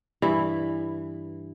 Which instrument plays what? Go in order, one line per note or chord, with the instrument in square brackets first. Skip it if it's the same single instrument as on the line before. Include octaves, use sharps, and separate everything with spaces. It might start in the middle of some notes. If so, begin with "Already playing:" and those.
[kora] G2 E3 E4